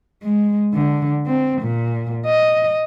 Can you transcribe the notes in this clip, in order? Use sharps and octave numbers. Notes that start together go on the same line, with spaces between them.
G#3
D3
C4
A#2
D#5